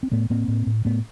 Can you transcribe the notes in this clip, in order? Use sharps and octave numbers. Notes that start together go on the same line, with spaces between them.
C4
A2 A3 B3
A2 A#3 C4
A2
A2
A2 A3 B3